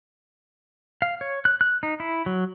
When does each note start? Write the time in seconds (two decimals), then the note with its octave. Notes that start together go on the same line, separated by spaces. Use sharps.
1.02 F5
1.21 C#5
1.45 F#6
1.61 F#6
1.83 D#4
2.00 E4
2.26 F#3